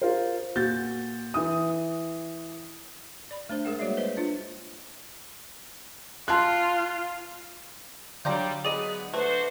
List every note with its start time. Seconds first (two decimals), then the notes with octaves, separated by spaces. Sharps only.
0.02 F4 A#4 C5
0.56 A#2 F#4 G6 A6
1.34 E3 D#6
3.31 D5 B5
3.49 A3 D4 C5
3.65 G#3 G#4 A#4 F#5
3.79 G3 A#3 F#4 C#5 D5 E5
3.97 B4 C5 D#5
4.17 D4 F4
6.28 F4 A5 C6 F#6
8.25 D3 F#3 G3 F4 D5 A#5 G6
8.65 G#3 B3 G#4 D5 D#5 D#7
9.14 A3 D4 F#4 B4 C5